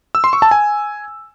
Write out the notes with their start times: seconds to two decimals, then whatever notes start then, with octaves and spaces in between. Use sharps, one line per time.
0.15 E6
0.24 C6
0.33 C#6
0.42 A5
0.51 G#5